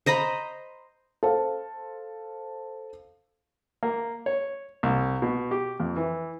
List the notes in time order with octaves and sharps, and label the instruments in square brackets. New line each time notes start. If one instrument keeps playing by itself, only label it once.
[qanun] C5 D#5 A#5 B5
[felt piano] A4 C5 F5 A5
[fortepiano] A#3
C#5
C2
B2
G4
F2
E3